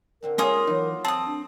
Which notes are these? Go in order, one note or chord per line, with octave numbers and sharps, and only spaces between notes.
D3 C4 D4 A#4
G#3 A#3 C#4 F4 C#5 G#5 D#6
E3 F#3 D#4
C4 A5 D#6
D4